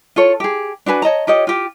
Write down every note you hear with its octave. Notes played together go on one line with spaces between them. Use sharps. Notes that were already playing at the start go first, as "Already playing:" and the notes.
F4 A4 C#5
G4 G#4
D4 F#4 B4 G#5
C#5 D#5 A5 A#5
F4 G4 C#5 D#5
F4 G4